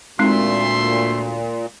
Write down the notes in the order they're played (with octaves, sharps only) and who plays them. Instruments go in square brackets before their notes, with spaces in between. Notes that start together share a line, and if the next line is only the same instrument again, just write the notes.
[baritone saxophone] D2 [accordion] A#2 [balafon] G#3 C4 D#4 [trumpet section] A3 E5 C6